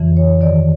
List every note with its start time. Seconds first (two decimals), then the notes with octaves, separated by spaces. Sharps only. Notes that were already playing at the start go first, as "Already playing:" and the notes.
Already playing: F2 C#3 E3
0.17 C#5
0.41 G2 D#3 D5